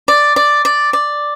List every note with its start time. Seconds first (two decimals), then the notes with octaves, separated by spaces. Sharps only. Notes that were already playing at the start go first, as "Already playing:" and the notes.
0.08 D5
0.36 D5
0.65 D5
0.93 D5